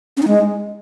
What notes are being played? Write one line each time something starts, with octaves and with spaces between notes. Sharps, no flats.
C#4
D#4
G#3